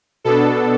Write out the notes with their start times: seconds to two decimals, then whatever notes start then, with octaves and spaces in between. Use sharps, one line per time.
0.24 B2 B3 D4 A4